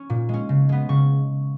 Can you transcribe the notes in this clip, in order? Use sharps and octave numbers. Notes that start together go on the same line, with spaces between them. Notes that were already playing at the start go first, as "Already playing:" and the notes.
Already playing: C#4 C#6
A#2
G#3 C#4
C#3
G#3 B3
C#3 C#6